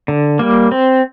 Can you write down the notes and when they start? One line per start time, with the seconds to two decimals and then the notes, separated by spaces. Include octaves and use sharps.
0.08 D3
0.39 G3 A#3
0.72 C4